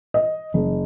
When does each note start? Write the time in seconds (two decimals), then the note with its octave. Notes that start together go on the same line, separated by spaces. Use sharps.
0.14 D#5
0.54 F#1